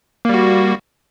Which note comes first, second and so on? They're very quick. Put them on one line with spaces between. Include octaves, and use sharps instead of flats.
A#3 G3 F#4